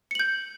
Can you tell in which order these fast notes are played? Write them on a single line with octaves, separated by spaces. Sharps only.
C#7 F#7 G6